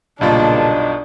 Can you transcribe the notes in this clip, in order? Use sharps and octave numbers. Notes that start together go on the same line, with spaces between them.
B1 G2 A#2 C#3 D4 F4 D#5 A5